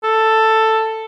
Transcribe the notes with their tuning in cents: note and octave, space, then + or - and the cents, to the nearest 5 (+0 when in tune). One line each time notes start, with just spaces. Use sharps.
A4 +5